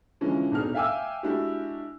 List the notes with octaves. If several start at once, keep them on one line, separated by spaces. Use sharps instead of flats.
D3 E3 F3 G#3 C#4 D4
D#1 B2 D4 D#4 G#4 F6
E5 F5 G5 G#5 D6 E6
G#3 D4 E4 F#4 G4